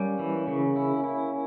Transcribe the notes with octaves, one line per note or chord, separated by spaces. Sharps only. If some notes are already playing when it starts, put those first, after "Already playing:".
Already playing: G3 A#3 C#4
E3
C#3
E4
E4